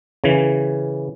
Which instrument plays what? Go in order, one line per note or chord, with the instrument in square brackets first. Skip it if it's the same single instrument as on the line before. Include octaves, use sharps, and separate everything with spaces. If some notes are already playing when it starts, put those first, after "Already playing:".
[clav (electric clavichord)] C#3 E3